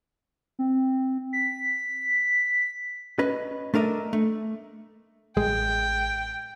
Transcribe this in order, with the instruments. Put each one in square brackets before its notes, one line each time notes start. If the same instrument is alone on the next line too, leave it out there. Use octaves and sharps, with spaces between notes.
[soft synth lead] C4
B6
[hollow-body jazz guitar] C#4 B4 D#5
A3 D4 A#4 D#5 E5
A3
[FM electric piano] A1 [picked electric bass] G#3 [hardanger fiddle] G5